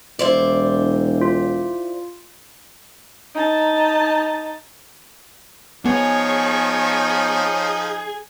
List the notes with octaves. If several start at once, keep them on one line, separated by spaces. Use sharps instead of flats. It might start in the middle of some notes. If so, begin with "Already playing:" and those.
E1 E4 C5 D5
F4
D#4 A5
F3 B3 D#4 G#4 C#5